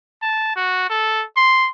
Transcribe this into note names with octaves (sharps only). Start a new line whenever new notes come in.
A5
F#4
A4
C6